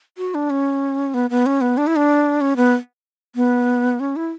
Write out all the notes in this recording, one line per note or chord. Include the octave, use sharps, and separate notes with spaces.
F#4
D4
C#4
B3
B3
C#4
B3
D4
E4
D4
C#4
B3
B3
C#4
E4